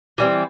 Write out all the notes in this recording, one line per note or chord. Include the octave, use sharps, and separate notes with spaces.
E3 G3 C4